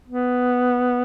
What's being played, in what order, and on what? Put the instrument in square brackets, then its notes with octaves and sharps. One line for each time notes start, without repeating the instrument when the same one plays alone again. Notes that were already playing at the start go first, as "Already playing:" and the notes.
[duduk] B3